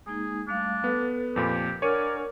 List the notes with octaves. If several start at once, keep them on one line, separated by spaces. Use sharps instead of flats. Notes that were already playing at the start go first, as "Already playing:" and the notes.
G#3 A#3 D#4 G#4
G3 A3 D4 F5
B3 A4 B4
F2 A#2 G4 B5
D4 A#4 C#5 D5 F#5 G#5 C#7 D#7